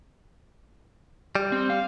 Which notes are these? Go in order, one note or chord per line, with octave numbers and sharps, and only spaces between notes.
G3
C4
F5